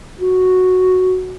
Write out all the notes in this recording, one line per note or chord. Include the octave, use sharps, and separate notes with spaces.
F#4